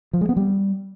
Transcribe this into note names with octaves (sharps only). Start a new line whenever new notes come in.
F3
G#3
B3
G3